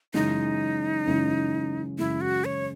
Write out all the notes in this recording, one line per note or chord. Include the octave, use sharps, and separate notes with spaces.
F#2 C#3 E3 G#3 D#4
F#2 C#3 E3 G#3
F#2 C#3 E3 G#3 E4
F#4
C#5